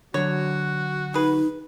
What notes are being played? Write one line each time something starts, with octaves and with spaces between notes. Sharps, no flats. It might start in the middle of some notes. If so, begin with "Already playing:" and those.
D3 F#3 F#4 C#5
D#4 G#4 B4